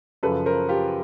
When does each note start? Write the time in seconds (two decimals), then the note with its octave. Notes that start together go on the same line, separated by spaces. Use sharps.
0.23 F#2 C#3 F3 A4 B4
0.46 A#4 C5
0.69 F4 G4